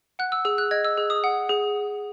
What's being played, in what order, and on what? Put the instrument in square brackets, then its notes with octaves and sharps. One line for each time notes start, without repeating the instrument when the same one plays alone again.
[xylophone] F#5 F#6
E6
G#4 E6
F#6
D#5 G#6
E6
G#4
D#6
F#5
G#4